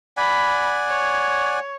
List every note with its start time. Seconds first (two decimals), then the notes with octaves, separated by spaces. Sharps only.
0.17 D5 F#5 G#5 B5
0.88 C#5